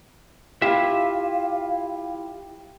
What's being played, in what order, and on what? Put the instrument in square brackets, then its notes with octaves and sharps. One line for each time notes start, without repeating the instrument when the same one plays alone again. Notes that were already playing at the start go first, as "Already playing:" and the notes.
[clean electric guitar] E4 F4 E5 [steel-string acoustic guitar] G4 [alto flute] F5